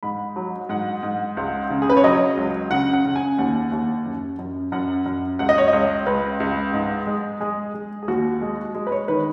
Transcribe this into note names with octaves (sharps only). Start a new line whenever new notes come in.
G#2 B5
F#3
G#2 F#5
G#2
C#2
C#3
G#4
B4
C#5
F#3 D#5
C#2
C#3 F#5
F#5
C#3
G#5
D#2 F#5
D#2
F#2
F#2
F#2 F#5
F#2
C#2 F#5
D#5
C#5
C#2 D#5
C#2 B4
C#2
G#2
G#3
G#3 G#4
G#3
G#4
D#2 F#4
G#3
G#3 G#4
B4
C#5
D#3 B4